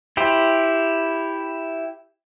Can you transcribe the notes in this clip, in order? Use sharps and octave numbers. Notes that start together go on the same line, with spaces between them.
E4 G4 C5